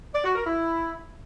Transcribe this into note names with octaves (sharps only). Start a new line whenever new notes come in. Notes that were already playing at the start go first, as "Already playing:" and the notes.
D5
F#4
A#4
E4